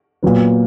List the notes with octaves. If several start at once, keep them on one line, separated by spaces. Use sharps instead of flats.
A#2 F#3 B3